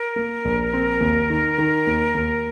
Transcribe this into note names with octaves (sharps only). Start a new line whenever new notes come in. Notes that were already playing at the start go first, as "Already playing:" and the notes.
Already playing: A#4
A#3
A#1
C4
D#2
D#3
D#3
D#2
D#2